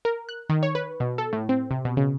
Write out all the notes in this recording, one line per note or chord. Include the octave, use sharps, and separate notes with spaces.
A#4
F#6
D#3
C#5
B4
B2
A4
A2
C4
C3
B2
C#3